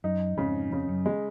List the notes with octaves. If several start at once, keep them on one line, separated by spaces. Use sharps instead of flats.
F#2 D#4
F2 G#2 C#3
F2 C#3
F#2
G#3